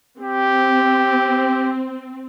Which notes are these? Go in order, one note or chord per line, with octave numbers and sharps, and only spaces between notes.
C4 G4